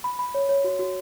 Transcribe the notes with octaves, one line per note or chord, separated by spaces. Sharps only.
B5
B5
C#5
C#5
F#4
F#4